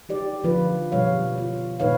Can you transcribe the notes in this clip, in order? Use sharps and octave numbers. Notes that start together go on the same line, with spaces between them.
D#4 G4 D5
D3 F3 F4 B4
B2 F3 G3 C#5 F5
F4
A#2 D#3 D#4 B4 C#5 F5